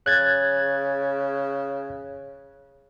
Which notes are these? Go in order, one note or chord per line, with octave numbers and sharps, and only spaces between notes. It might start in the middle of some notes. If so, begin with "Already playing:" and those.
C#3 F#6 G#6 A6